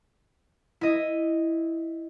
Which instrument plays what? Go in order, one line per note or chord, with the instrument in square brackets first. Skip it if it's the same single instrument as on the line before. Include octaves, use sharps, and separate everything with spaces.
[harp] E4 D#5